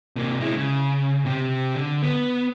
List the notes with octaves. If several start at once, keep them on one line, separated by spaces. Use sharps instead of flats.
C3 A#3
G#3 E4
C#3
C3 G4
D3
B3